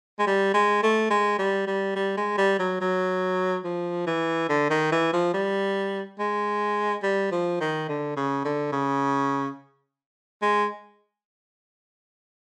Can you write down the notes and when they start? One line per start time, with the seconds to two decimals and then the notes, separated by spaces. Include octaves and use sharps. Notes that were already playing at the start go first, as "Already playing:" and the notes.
0.19 G#3
0.27 G3
0.54 G#3
0.83 A3
1.10 G#3
1.39 G3
1.67 G3
1.96 G3
2.17 G#3
2.38 G3
2.59 F#3
2.81 F#3
3.64 F3
4.07 E3
4.49 D3
4.70 D#3
4.92 E3
5.13 F3
5.34 G3
6.19 G#3
7.03 G3
7.32 F3
7.60 D#3
7.88 D3
8.17 C#3
8.45 D3
8.72 C#3
10.42 G#3